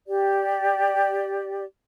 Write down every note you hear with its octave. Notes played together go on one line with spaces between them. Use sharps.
G4 D5